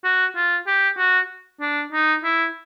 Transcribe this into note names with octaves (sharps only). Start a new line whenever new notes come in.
F#4
F4
G4
F#4
D4
D#4
E4